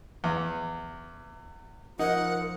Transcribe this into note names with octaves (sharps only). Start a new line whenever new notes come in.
E2
F3 D#4 A#4 F#5